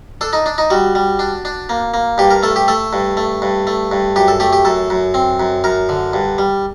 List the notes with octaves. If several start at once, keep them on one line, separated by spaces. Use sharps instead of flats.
D4 A4
D#4
D4
D#4
G3 F#4
G3
D4
D4
A#3
A#3
G2 G4
A#4
A3 A4
G4
A3 A4
G2
A3
G2
A3
G2
F#2 G4
A4
A3 G4
G4
F#2 A4
F#2
C4
F#2
F#2 A#4
D3
G2
G3